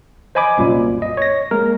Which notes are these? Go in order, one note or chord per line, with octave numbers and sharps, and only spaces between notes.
C5 D#5 G#5 B5 D6
C2 F#2 A#2
D#5
C#5 A#6
G#3 A#3 A#4